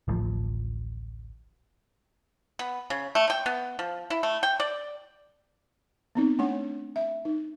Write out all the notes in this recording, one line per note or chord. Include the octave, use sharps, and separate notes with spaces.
D1 A1 A2 F3
B3
C#3
A3
G5
B3
F3
E4
A3
G5
D5
B3 C4 D#4
A3 D4 C#5 F#5
E5
D#4